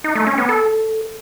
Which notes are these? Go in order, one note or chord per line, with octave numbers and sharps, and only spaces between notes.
D#4
A3
C#4
B3
A4